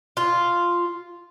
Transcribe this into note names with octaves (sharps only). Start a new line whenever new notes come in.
F4